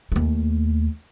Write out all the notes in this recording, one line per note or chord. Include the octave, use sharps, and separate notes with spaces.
D#2 A3